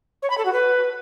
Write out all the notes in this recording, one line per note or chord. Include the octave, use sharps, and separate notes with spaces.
C#5
B5
A4
F#4
B4